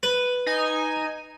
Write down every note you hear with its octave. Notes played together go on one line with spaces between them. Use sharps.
B4
D#4 G#5